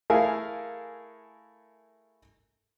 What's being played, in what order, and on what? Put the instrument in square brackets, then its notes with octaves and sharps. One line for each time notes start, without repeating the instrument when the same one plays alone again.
[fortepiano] A3 E4 G#4 A#4 F5 G#5